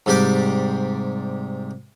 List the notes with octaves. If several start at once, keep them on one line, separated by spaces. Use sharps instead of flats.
G#2 C3 G3 G4 D5 D6